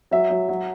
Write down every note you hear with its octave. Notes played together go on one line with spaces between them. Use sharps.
F#3 E5
F#3
F#3